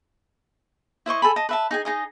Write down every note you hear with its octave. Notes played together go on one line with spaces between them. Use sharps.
E4 C5 D#5 C#6
A4 G#5 B5
D#5 A5
B4 E5 A5
D#4 G#4 G#5
D#4 G#4 D#5